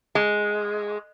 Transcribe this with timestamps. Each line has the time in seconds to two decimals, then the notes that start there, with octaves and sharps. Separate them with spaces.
0.15 G#3